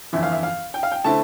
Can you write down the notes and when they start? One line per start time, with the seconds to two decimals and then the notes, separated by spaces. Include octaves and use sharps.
0.13 G1 F2 E3 E5
0.23 F5
0.32 E5
0.43 F5
0.74 G5
0.83 F5
0.92 G5
1.04 D3 A3 C4 E4 A5